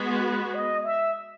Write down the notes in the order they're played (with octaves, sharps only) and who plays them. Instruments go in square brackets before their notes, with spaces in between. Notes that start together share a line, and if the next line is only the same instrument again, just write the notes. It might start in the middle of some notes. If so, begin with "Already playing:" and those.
Already playing: [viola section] G#3 B3 F#4
[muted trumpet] B4
D#5
E5